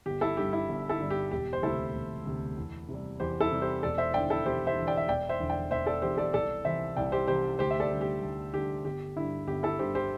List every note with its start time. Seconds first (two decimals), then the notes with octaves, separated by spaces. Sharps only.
0.06 G1 G4
0.21 E4 A4
0.37 G2 D3 G3 G4
0.53 E4
0.69 G1
0.89 E4 A4
1.00 G2 D3 G3
1.10 G4
1.31 E1 G4
1.53 C5
1.62 D2 C3 E4 A4
1.95 E1
2.25 D2 C3
2.57 E2
2.88 C3 G3
3.20 E2 G4 C5
3.41 E4 A4
3.52 C3 G3
3.62 G4 C5
3.83 E1 A4 D5
3.98 C5 E5
4.14 E2 D3 D5 G5
4.30 E4 A4
4.46 E1 G4 C5
4.67 C5 E5
4.76 E2 D3
4.87 D5 G5
4.97 E5
5.08 E1 D5 G5
5.29 C5 E5
5.40 E2 D3
5.50 D5 G5
5.70 E1 C5 E5
5.86 A4 D5
6.02 E2 D3 G4 C5
6.18 A4 D5
6.33 C2 A4 D5
6.65 C3 E3 C5 E5
6.96 C2 D5 G5
7.12 G4 C5
7.27 C3 E3 G4 C5
7.59 D2 G4 C5
7.71 E5
7.80 A4 D5
7.91 D3 G3
8.01 G4
8.22 D2
8.54 D3 G3 G4
8.85 G1 G4
9.16 G2 D3 E4
9.47 G1 G4
9.63 E4 A4
9.79 G2 D3 G4 C5
9.95 G4 C5